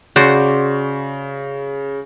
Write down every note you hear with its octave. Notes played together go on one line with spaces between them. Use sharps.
C#3 F#4 C5 D5